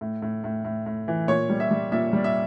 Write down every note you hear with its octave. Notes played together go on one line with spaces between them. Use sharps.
A2
A2
A2
A2
A2
E3
A#2 C#5
G3
E5
G3
A#2 E5
G3
E5